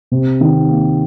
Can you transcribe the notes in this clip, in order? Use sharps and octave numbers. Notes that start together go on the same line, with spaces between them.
C3
D#3
A#3